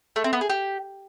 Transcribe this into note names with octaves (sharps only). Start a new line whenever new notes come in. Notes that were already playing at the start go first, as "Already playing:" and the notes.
A3
C4
B3
G#4
G4